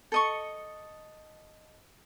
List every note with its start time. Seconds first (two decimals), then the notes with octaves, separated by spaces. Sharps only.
0.12 A4 D#5 C#6